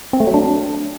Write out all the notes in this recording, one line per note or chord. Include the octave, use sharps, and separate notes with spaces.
C4
A3
F#3
D4